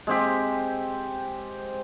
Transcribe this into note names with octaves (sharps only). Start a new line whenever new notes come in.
G#3 C4 G4